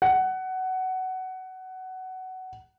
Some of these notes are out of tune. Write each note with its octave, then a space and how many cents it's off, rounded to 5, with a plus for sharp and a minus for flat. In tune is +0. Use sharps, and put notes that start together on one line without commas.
F#5 +15